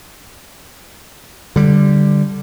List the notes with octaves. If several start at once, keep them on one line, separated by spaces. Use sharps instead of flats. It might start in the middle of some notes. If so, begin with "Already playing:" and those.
D3 G3